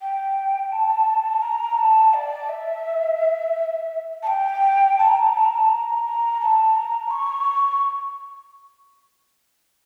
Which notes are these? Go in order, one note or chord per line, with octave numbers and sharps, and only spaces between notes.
G5
A5
A#5
A5
D5
E5
A5
G5
A5
A#5
A5
A#5
A5
A#5
A5
A#5
A#5
A5
A#5
C#6